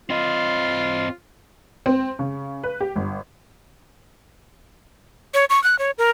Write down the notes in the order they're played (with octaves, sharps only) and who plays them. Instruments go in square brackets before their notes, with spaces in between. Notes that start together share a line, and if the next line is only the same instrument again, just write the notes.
[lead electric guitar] C4 D#5 [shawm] F4
[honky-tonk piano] C4
C#3
B4
G4
G1
[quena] C#5
C#6
F#6
C#5
A#4